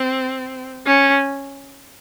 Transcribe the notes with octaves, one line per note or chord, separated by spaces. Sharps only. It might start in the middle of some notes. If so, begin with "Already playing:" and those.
Already playing: C4
C#4